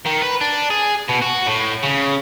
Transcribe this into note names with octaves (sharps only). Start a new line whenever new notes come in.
D#3
B4
D4
G#4
B2
F#4
A2
C#3